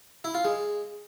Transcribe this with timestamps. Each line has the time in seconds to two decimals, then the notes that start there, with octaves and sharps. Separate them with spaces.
0.24 E4
0.35 F4
0.45 G#3